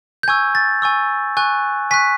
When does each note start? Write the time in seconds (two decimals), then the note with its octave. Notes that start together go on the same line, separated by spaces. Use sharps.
0.23 G6
0.28 G#5 C#6 E6 G#6
0.55 A6
0.82 G#5 C#6 E6
1.37 G#5 C#6 F#6
1.91 G#5 C#6 F#6 B6